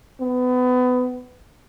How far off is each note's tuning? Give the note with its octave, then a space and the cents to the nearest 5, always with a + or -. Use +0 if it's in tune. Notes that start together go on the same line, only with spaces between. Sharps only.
B3 +25